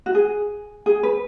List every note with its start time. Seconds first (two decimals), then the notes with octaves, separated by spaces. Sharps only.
0.06 F#4
0.15 G#4
0.86 G#4
1.03 B4